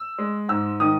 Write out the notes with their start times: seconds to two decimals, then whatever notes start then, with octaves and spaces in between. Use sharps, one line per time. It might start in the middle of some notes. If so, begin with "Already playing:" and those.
Already playing: E6
0.18 G#3
0.49 G#2 E6
0.80 D#3 D#6